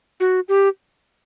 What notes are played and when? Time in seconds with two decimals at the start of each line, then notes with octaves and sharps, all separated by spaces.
0.20 F#4
0.49 G4